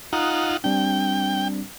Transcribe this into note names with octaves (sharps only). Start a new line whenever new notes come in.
D#4 F4 F#5 A#5 D#6 F#6
G3 C4 D4 G5